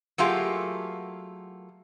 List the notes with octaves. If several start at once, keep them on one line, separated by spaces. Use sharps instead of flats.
F#3 A3 A#3 F4 G4 G#4